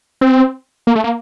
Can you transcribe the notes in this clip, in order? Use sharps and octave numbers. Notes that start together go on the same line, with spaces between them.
C4
A#3
A3
A#3